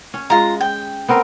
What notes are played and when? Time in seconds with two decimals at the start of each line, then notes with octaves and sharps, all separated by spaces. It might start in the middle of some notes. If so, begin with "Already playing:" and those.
0.14 C#4
0.30 G#3 F4 A#5
0.61 G5
1.09 B3 C4 A#4